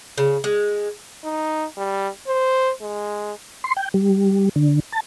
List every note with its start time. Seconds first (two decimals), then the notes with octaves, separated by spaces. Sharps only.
0.18 C#3
0.44 G#3
1.24 D#4
1.77 G3
2.28 C5
2.82 G#3
3.64 C6
3.77 G5
3.94 G3
4.56 D3
4.92 A5